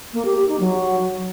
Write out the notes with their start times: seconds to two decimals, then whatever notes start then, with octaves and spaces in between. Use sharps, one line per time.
0.13 A#3
0.25 G4
0.37 G4
0.48 D#4
0.60 F#3